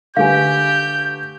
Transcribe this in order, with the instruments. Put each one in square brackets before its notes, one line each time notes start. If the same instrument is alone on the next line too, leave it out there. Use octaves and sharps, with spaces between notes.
[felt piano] D3 A3 B4 [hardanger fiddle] G4 [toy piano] F5 G#5 [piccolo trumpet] G6